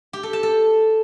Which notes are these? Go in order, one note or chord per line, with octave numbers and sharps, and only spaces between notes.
G4
A4
A5
A4